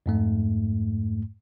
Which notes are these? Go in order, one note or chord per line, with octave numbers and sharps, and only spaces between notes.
F2 G#2 A3